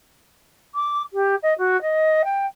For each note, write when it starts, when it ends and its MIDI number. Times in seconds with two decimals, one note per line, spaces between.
0.75 1.02 86
1.13 1.35 67
1.43 1.54 75
1.58 1.80 66
1.82 2.22 75
2.24 2.46 79